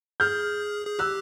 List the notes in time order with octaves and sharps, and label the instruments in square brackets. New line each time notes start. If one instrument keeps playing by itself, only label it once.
[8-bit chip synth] G#4 [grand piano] F6 G6
[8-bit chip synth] G#4
[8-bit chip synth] G4 [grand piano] E6 F#6